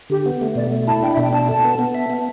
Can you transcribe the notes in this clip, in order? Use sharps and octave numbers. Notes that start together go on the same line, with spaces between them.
D3 G4
B3
A3
B2 D5
A3
E4 A5
D4 G5
E5
B2
G5
D4 A5
A4 A5
B3
B3
E5
B3